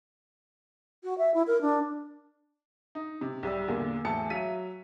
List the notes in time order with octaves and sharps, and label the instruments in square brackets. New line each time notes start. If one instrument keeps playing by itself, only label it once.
[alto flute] F#4
E5
E4
A#4
D4
[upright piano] D#4
C3
C2 G3 E6
E2 A#2 D3 A#3
E1 A2 E3 A5 C#7
F#3 E5 F5 B6 D#7